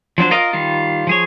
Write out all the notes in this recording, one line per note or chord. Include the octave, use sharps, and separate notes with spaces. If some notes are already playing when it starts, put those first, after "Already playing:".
F3 F#3 D4 C5
F4 A#4 D#5 F5
D#3 G3 F4
F3 G#4 C#5